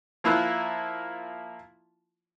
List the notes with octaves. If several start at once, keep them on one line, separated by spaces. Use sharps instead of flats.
F3 A#3 E4 F4 B5 F#6